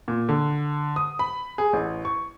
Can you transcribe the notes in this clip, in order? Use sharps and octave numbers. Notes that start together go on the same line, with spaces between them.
A#2
D3
D#6
B5
G#4
A1
C#6